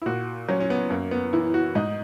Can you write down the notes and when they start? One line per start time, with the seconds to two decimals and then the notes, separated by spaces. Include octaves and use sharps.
0.02 E4
0.06 A#2 F#4
0.49 F#3 C#4
0.60 C#4
0.70 B3
0.90 F#2 A#3
1.11 B3
1.33 E3 E4
1.54 F#4
1.75 G#2 D#4